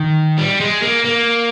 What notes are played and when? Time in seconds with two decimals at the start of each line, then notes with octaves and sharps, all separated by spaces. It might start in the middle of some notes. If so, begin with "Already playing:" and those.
Already playing: D#3
0.38 G3
0.61 G#3
0.83 A#3
1.05 A#3